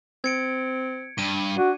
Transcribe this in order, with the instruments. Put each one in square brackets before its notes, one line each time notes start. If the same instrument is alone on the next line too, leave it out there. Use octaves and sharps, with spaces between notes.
[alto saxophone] C4 [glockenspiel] G#6 C#7 D7
[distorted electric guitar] G2 [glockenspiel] D#7
[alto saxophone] D4 [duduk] F#4